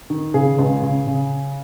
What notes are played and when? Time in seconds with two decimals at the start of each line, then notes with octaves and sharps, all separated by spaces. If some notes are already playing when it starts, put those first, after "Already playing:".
0.10 D#3
0.34 C#3 G#4
0.58 C#2
0.82 C#3
1.07 C#3